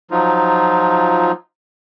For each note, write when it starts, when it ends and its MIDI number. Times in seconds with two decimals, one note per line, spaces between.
0.11 1.32 53
0.11 1.32 54
0.11 1.32 63
0.11 1.32 65